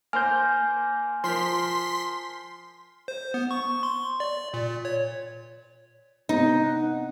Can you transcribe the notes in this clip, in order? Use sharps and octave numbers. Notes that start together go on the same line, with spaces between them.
A#3 C5 G#5 F6 G6
F3 A#4 C6 B6
C5
B3
C#6
C6
D5
A#2
C#5
C3 B3 C4 D#4
F#5